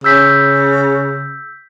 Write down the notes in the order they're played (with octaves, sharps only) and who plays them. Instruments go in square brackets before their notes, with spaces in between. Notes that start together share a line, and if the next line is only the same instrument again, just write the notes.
[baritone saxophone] C#3 [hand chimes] E6 G6 B6